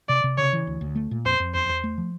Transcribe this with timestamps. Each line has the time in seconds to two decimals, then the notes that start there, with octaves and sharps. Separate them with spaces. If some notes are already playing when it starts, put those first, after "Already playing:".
0.09 C3 D5
0.24 C3
0.38 C#3 C#5
0.53 E3
0.67 D2
0.81 D2
0.95 A3
1.11 A#2
1.25 F2 C5
1.40 F2
1.55 E2 C5
1.69 E2
1.84 A3
1.98 F3